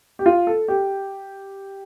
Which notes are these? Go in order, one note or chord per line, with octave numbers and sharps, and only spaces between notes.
G4
F4
A4
G4